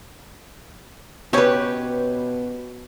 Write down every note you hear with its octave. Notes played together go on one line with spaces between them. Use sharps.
B2 C4 C#4 G4 B4 C#5